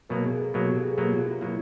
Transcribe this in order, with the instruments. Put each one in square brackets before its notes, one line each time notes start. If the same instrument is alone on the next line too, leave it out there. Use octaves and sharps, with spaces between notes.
[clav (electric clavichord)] B2 F#3 A#3 [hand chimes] A#4
[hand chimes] G#4
A4
[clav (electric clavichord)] B2 F#3 A#3 [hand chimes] A4
[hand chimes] G4
G#4
[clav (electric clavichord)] B2 F#3 A#3 [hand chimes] G4
[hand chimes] F4
E4
[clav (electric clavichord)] B2 F#3 A#3 [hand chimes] E4